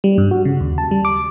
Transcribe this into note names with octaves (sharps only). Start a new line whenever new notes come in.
G3
G2
F#4
C#3
D#2
A5
G3
D6